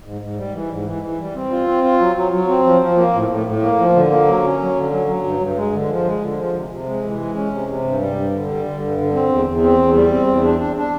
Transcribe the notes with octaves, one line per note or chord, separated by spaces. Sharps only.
G#2
G#2
G3
E3
G#2
E3
E3
G3
C4
F4
C4
F4
F#3
F#3
F#3
C4
F3
F3
A#3
A2
A2
A2
A#3
F3
D3
A#3
F#3
C#4
F#3
D3
F#3
F#3
G2
G2
G#3
D3
F3
G#3
D3
F3
C3
C3
G#3
E3
G#3
C#4
C3
C3
G2
G3
G2
D3
G3
D3
G2
D3
C4
E2
E2
C4
E2
G3
C4
E2
D4
D4
D4